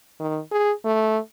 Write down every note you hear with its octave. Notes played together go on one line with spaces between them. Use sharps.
D#3
G#4
A3